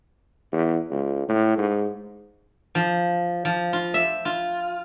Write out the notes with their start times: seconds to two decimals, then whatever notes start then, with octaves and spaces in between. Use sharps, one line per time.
0.52 E2
0.91 C#2
1.28 A2
1.58 G#2
2.75 F3
3.45 F3
3.73 F4
3.94 E5
4.25 F4